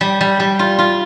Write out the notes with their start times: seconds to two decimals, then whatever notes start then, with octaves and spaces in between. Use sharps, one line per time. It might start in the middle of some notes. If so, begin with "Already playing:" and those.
0.01 G3
0.21 G3
0.40 G3
0.59 F4
0.79 F4